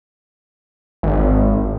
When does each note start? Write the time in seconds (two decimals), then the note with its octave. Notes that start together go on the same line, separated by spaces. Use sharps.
1.03 G#1